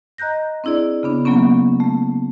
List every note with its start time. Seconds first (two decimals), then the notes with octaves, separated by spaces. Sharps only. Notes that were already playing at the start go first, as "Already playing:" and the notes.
0.18 D#5 A#5 F#6 G6 A#6
0.64 C4 D4 E4 G#4 D5
1.03 C#3 B3 D4
1.25 F#3 A#3 B3 C#4
1.80 A3